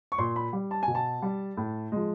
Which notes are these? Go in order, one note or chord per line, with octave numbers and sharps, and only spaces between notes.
C#6
A#2 C6
B5
G3
A5
G#5
B2
A5
G3
A2
F3 G#3